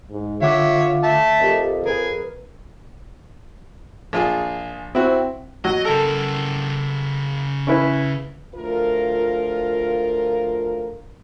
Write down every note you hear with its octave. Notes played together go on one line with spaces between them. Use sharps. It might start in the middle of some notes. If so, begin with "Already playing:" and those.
G#2
D3 F4 C#5 E5 F#5 D6
E5 A5
F2 G4 A#4 D#5
G#4 A#4 B4
A#1 F4 G#4
C4 E4 F#4
F#3 D#5
C#3 A4 A#4
C#4 E4 B4
D2 F3 F4 A#4